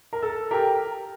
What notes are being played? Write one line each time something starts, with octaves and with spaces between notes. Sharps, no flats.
A#4
A4
G4 A#4